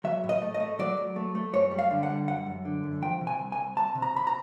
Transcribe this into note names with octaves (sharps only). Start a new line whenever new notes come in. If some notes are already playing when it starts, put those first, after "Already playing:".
F#3 E5
A2
D#5
A3
D#5
A3
F#3 D5
F#3
A3
A3
F#2 C#5
G3
F5
D3
F#5
G3
F#2 F#5
F#2
D3
F#2
F3 G5
C3
G#5
C2
G#5
C2
C2 A5
C3
A#5
C3 B5
A#5